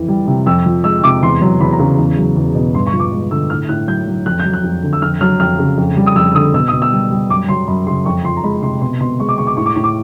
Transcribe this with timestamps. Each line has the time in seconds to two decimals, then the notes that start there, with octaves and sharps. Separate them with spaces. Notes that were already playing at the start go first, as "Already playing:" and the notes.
Already playing: F2 E3
0.08 G3
0.27 C3
0.46 F2 E6
0.66 F3
0.84 G#3 E6
1.03 C3 D6
1.22 E2 C6
1.42 F#3
1.61 E2 B5
1.73 A#5
1.79 C#3
1.98 E2
2.17 F#3
2.36 E2
2.55 B2
2.74 G2 C6
2.87 C#6
2.93 F3
3.00 D6
3.12 G#3
3.31 D3 E6
3.50 A2 F6
3.69 A2 F#6
3.88 F#3 G6
4.07 F#3
4.26 F2 F#6
4.40 G6
4.45 F#3
4.53 F#6
4.64 F2
4.83 D3
4.93 E6
5.02 F2 F6
5.21 F#3 F6
5.40 F2 F6
5.59 C#3
5.78 F2
5.97 G3
6.06 D#6
6.16 F2 E6
6.35 D3 D#6
6.54 B2 E6
6.68 D#6
6.73 B2
6.82 E6
6.92 G3
7.11 G3
7.29 F#2 D6
7.49 F#3 C6
7.67 F#2 B5
7.87 C#3 C6
8.05 F2 C#6
8.25 F3 C6
8.36 A#5
8.44 G#3 B5
8.62 C3 C6
8.81 B2 C6
9.00 B2 C6
9.19 G#3 C#6
9.29 D6
9.38 G#3 C#6
9.47 D6
9.57 A2 C#6
9.66 D6
9.75 A2 C#6
9.84 D6